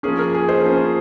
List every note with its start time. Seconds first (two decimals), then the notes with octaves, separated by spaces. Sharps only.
0.03 F3 A#3 C#4 G#4
0.19 A#4
0.35 G#4
0.49 C5
0.64 F3 A#3 C#4